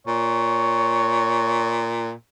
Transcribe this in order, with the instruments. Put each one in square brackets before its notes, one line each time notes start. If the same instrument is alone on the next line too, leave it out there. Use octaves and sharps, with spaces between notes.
[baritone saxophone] A#2 [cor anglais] C#5